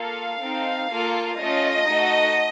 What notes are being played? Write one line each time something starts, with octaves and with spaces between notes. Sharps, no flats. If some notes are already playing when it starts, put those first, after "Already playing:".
Already playing: A#3 F4 A4 F5
C4 D#4 A4
A#3 F4 A4
A3 C#4 F4 D#5
A3 D#4 F#4 A4